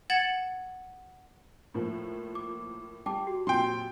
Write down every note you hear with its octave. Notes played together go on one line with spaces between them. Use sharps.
F#5 G#6 A6 C#7 E7 F#7
A2 F3 A#3 F4
D6
G3 G5 A5 D6
F#4 G4
F2 A#2 F#3 G5 C6